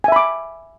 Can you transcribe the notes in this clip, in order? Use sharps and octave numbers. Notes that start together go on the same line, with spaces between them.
E5 G#5 B5 D6